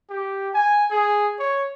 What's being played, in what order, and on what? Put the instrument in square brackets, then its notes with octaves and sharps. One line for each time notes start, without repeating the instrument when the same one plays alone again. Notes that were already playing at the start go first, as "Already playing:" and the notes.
[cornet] G4
G#5
G#4
C#5